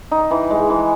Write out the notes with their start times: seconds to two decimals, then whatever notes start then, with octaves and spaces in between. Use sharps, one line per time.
0.11 D#4
0.31 E3
0.50 G#3
0.70 E3